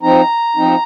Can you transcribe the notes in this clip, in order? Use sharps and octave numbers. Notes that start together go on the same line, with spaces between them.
F3 C4 D#4 A#5
F3 C4 D#4